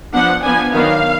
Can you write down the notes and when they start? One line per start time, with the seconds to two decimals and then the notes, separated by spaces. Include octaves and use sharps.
0.14 F3 B3 D4 F#5
0.44 F3 B3 D4 G#5
0.73 D#3 F#3 B3 D4 F5